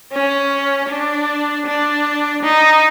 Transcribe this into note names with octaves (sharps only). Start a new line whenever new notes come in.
C#4
D4
D4
D#4